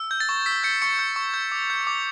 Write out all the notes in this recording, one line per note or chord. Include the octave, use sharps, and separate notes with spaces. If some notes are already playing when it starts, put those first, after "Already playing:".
Already playing: E6
G6
A6
C#6
E6 B6
G6 C#7
C#6 C#7
G6
C#6
G6
D6
G6
D6